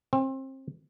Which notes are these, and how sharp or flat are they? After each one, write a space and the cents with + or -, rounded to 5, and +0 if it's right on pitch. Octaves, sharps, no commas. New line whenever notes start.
C4 +30